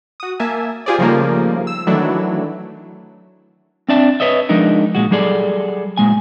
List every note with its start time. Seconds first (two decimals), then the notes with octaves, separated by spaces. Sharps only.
0.20 F#4 D#6
0.39 A#3 E5 G#5 A5
0.86 F4 G4 G#4 C5 D5
0.98 C#3 F3 G3 A3 A#3 D#4
1.67 E6
1.87 D#3 E3 F#3 A3 D4 E4
3.89 C4 D4 D5 E5 A5
4.20 B4 C#5 D#5 E5
4.49 F3 G#3 D4 D#4 A#4
4.95 A#2 G#3 F#4
5.11 F#3 G3 G#4 A4 D5
5.98 A#2 G#3 G#5